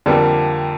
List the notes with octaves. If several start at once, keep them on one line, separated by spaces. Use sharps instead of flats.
F2 D3 G3 A#3